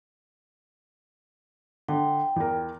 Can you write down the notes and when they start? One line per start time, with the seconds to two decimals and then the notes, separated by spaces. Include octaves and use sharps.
1.88 D3 G5
2.36 E2 A#4